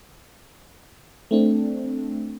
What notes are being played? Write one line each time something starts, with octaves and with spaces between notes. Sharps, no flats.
A3 C4 D4